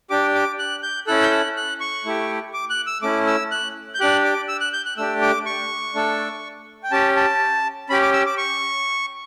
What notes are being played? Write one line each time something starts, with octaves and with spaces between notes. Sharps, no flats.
D4 G4 D6
D6
F#6
G6
C#4 E4 A4 F#6
G6
F#6
F#6
C#6
A3 E4 G4
D6
F#6
E6
A3 C#4 E4 D6
E6
F#6
G6
D4 G4 F#6
D6
E6
F#6
G6
F#6
A3 D4 G4 E6
D6
C#6
A3 D4 A4
G5
C#4 G4 A5
A5
C#4 G4 B5
D6
E6
D6
C#6